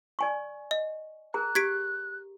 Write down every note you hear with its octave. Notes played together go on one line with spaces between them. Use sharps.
D5 G#5 C#6
D#5
G#4 A#4 A#5 F#6
G4 G#6 B6 D7